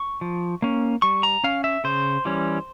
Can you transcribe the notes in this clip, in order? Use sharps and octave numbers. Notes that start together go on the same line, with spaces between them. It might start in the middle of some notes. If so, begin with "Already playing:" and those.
Already playing: C#6
F3
A#3 C#4
G3 C#6
A#5
C#4 F5
E5
C#3 C5
E3 G3 C#4